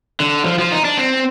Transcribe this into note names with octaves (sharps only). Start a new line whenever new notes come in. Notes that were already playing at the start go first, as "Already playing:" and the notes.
D3
F3
F3
D#4
D4
C4